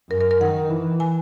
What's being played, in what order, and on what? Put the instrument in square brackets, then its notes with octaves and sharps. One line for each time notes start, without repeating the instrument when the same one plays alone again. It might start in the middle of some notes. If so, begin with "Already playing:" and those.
[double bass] F#2 [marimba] A#4
[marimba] A#4
A#4
[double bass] D#3 [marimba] F#5
[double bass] E3
[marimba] G#5